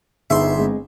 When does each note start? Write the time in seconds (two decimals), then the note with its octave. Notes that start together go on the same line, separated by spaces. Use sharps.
0.30 G1 G3 B3 D#4 G#4 E5 C6
0.57 G#3 C4 G#4